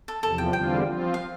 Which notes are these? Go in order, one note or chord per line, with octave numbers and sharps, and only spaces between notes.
A4
E2 C3 F3 A4
G5
E2 D3 G3 C4 F4 G5
F3 C4 F4
F5